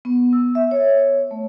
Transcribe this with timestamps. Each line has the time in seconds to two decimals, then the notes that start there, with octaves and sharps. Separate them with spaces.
0.05 B3
0.33 E6
0.55 E5
0.71 C#5
1.31 A3